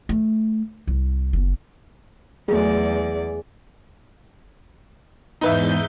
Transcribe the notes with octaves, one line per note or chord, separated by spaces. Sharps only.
A3
C2
F#1 B3
E2 F#3 A3 G#4 D5
E2 G#2 D#4 B4 E5 G6